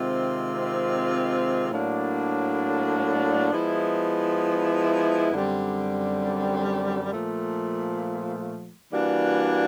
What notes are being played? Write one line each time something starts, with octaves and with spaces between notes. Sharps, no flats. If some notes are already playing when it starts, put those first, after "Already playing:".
Already playing: C3 D#3 G#3 C4 F4
A2 F#3 A#3 D4
F3 G#3 B3 E4
F#2 D3 G3 C4
A#2 F3 A3
E3 G3 A#3 D4 F#4